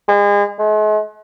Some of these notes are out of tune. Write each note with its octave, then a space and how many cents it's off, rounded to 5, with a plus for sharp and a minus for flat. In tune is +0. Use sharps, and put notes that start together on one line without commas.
G#3 -35
G#3 +45